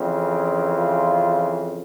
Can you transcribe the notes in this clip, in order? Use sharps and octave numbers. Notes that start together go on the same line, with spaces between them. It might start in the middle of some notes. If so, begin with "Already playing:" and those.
Already playing: F2 C#3 E3
F4